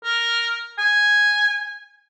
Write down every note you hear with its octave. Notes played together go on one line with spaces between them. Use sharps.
A#4
G#5